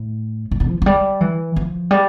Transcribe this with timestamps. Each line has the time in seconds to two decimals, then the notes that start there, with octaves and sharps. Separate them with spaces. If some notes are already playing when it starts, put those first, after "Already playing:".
Already playing: A2
0.51 A2
0.60 A#2
0.69 F3
0.82 F3
0.86 G3
1.21 E3
1.56 F3
1.91 G3